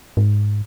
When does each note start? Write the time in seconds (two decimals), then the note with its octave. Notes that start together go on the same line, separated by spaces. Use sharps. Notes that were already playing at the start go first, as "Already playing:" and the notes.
0.17 G#2